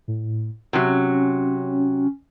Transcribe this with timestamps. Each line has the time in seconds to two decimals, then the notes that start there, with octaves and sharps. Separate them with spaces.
0.08 A2
0.73 C3 F#3 C#4